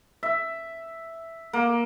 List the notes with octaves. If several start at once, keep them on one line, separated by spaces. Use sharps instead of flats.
E5
A#3